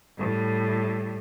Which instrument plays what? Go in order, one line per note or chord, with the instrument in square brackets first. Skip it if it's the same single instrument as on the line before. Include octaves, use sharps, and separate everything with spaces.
[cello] A2 G3